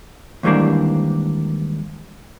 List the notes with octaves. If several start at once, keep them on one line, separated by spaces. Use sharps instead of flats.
D#2 G#2 E3 G3 A#3 D4